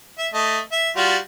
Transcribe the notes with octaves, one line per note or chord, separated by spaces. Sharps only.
E5
A3 D#5
E5
G3 F4 F#4